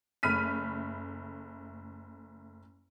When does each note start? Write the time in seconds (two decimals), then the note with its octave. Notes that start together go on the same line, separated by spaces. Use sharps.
0.23 F#1 A3 B5 F6 B6 D#7